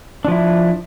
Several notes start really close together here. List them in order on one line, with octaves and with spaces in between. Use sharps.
D4 F3 E4